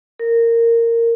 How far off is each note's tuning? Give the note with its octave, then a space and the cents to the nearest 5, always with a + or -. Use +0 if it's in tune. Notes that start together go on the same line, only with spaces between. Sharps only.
A#4 -15